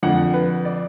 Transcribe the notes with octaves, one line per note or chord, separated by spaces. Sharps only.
F2 D3 F#5
B4
D5